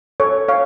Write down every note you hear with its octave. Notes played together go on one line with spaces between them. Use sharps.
A4 C#5
C#5 F5